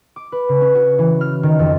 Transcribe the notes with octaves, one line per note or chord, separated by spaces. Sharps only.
D6
B4
C#3
C#4
F#4
E3
F6
D#3
F2